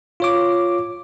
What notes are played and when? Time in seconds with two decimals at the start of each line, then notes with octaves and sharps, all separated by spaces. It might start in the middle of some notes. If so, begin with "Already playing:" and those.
0.20 F4 C#5 D6